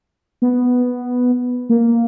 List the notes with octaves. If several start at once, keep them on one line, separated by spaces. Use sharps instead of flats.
B3
A#3